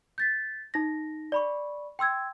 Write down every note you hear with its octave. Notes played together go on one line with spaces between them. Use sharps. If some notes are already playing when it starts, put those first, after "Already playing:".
G6 A6 B6
D#4 A#6
D5 B5 C#6
G5 C6 E6 G#6